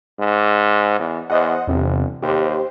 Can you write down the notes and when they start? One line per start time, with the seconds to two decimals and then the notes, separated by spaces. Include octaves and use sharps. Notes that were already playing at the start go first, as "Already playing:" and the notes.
0.19 G#2
0.99 E2
1.30 E2 C5 D#5 F#5
1.67 G1 E2 C3
2.22 D#2 G4 C5